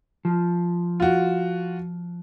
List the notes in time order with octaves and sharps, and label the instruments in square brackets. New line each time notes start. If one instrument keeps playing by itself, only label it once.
[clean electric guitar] F3
[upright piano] F4 F#4